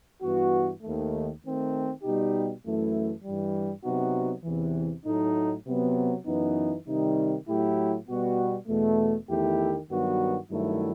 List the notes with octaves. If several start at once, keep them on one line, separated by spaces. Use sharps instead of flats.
G2 E3 B3 F#4
D#2 D#3 A3
D#3 A3 C4
B2 G3 D#4 G4
F#2 E3 A3 E4
G2 E3 G3
C3 F#3 B3 D#4 F#4
E2 C3 E3
A2 F#3 A3 D#4
C3 F#3 B3
F#2 E3 B3 D#4
C3 D#3 G3 D#4
A2 F#3 A3 E4 G4
B2 G3 B3 F#4
E2 B2 A3
E2 D#3 A3 E4 G4
G2 D#3 F#3 B3 F#4
G2 D#3 F#3 A3 E4